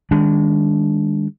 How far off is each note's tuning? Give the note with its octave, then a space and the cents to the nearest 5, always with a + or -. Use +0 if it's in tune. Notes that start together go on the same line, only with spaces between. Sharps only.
D#3 +0 G#3 -35 D4 -20